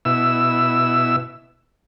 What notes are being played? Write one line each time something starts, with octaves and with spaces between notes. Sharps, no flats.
B2 E4 E6